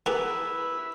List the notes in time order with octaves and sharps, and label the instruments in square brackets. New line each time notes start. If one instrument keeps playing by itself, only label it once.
[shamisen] B3 [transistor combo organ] E4 B4 [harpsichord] G4 G#4 A#4